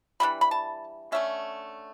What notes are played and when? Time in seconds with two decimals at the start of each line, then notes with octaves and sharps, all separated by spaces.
0.20 C#3 E3 G3 D4 B5
0.41 B5
0.51 A5
1.12 D3 A3 C#4 E5